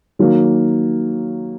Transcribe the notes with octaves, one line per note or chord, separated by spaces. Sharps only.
D#3 F#3 A#3